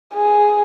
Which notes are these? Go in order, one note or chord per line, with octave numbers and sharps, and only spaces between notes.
G#4